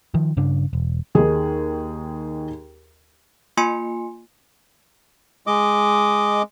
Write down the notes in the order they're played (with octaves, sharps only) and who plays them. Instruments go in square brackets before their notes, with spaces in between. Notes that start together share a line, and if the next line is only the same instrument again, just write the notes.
[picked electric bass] D#3 F3
G2 C#3 D4
E1
[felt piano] D#2 D#3 G#4
[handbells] A#3 F4 G#5 C6 C#7
[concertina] G#3 D#5 D6